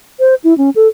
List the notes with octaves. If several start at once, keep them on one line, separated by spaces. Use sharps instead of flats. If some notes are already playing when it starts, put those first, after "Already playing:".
C5
E4
C#4
A4